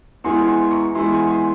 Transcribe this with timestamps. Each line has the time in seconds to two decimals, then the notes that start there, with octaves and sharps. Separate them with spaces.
0.24 E2 E3 G#3 E4 G#5 C6
0.47 G#5 C6
0.71 A#5 C#6
0.95 E2 E3 G#3 E4 G#5 C6
1.13 G#5 C6
1.30 G#5 C6